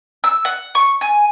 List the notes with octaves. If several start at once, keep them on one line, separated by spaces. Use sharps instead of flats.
E6
F#5
C#6
G#5